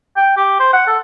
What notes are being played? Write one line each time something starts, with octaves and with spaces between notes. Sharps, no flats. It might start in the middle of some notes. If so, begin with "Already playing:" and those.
G5
G4
C5
F#5
A4